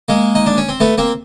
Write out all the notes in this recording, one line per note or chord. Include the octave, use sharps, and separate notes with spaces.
G#3 A#3
D#4
D4
C#4
C4
A3 B3
A#3 C4